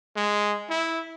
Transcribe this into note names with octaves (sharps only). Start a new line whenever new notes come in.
G#3
E4